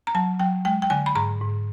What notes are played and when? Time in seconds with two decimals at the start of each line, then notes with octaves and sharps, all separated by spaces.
0.07 A#5
0.15 F#3 A5
0.40 F#3 G5
0.65 G#3 G5
0.82 G5
0.90 D3 G#5
1.06 B5
1.15 G#2 A#5
1.41 G#2